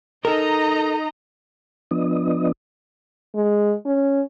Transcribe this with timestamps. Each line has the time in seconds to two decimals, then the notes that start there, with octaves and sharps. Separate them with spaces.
0.25 D#4 A4 A#4 D#5 A#5
1.91 F3 B3 D4 D#5
3.35 G#3
3.85 C#4